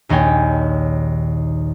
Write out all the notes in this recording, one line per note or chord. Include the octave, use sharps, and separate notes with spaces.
A#1 D#2 A#3 C#5 G5 G#5